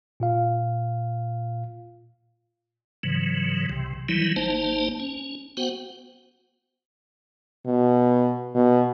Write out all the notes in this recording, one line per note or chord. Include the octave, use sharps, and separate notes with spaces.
A#2 F4 F5
G#2 C#3 E3 F#3
C2 C3
D#3 E3 F#3 G3 E4
G#1 A#3 D#4 C5 A5
C#4
B3 F#4 C5 F#5 G5
B2
B2